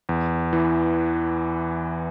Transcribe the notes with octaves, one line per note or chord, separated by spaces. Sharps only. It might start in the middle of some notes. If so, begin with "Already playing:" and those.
E2
E3